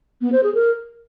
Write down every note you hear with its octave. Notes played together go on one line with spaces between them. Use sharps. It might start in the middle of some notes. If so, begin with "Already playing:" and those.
B3
C5
G#4
A#4